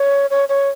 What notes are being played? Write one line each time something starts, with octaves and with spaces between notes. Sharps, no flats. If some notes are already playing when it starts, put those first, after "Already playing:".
Already playing: C#5
C#5
C#5